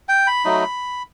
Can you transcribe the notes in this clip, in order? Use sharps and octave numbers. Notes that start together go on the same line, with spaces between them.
G5
B5
F#3 A3 D#4